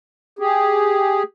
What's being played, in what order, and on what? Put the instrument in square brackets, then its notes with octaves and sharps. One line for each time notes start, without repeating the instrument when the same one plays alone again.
[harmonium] G4 G#4